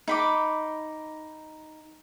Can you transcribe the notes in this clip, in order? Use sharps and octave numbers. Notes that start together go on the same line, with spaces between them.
D#4 B5 D6